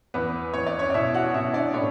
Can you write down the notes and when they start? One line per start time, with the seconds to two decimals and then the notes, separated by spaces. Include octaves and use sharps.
0.14 E2 B3 B4
0.54 E2 C#5
0.66 D5
0.79 C#4 C#5
0.90 D5
0.94 B2 E4 E5
1.14 F#4 F#5
1.34 B2 E4 E5
1.54 D4 D5
1.74 A2 C#4 C#5